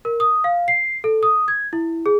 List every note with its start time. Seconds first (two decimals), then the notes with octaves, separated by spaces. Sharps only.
0.05 A#4
0.20 D#6
0.44 F5
0.68 C7
1.04 A4
1.23 D#6
1.48 G#6
1.73 E4
2.06 G#4